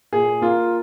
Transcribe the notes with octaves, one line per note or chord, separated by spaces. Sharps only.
A#2 G#4
A#3 F4